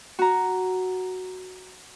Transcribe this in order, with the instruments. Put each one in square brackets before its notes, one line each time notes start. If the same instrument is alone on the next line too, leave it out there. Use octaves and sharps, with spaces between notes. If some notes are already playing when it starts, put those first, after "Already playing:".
[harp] F#4 A#5